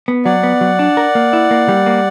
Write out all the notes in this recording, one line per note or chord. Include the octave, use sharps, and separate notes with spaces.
B3
F#3 D5 F#5
B3
F#3
D4
A#4
A#3
E4
A#3
G3
A#3